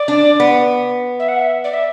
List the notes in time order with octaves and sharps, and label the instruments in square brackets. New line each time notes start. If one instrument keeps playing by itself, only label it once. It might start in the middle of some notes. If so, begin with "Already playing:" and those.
Already playing: [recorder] D5
[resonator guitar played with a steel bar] D4
B3
[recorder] E5
F#5
E5
D5
E5